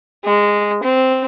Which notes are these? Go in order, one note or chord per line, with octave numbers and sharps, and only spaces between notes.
G#3
C4